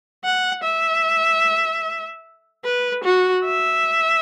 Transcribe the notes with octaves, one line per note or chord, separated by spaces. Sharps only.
F#5
E5
B4
F#4
E5